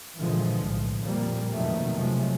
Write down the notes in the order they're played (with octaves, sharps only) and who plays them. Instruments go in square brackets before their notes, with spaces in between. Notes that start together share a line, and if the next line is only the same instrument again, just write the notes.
[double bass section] G2 A#2 D3 E3 F3 G#3
B1 A2
F2 A#2 F3 G3 A#3
F2 B2 D#3 F3 F#3 A3
C3 F3 F#3 G#3 A3